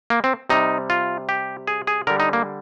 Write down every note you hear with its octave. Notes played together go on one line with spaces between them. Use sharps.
A#3
C4
C3 G3 D#4
F4
G4
G#4
G#4
D3 G3 A#4
D#4
A#3